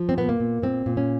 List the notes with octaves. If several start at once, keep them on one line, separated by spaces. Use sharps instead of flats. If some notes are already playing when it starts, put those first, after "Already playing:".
Already playing: F3
C4
A#2 B3
A#3
A#2
A#2 C4
A#2
C#4